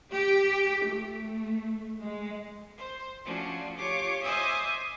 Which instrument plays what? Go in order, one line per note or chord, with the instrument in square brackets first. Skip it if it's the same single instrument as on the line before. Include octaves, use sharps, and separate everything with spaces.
[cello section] G4
A3
G#3
[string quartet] C5
F3 A3 C#4 D4 F4 F#4
F4 G4 C#5 D6
C5 D#5 E5 G#5 D6 D#6